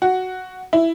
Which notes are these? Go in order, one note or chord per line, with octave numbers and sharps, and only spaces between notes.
F#4
E4